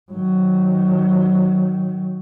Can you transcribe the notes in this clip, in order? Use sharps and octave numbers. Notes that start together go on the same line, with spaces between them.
D#3 F#3